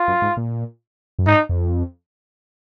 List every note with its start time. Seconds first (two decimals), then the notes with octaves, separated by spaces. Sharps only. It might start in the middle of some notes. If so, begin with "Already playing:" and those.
Already playing: F4
0.08 F#2
0.22 G#2
0.37 A#2
1.19 F#2
1.27 G#2 D#4
1.49 F2